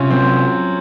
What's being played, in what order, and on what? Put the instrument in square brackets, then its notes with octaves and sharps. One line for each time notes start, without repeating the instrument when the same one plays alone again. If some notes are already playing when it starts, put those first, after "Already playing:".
Already playing: [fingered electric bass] C3 [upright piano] C#4 F4
[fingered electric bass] F#3 [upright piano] C4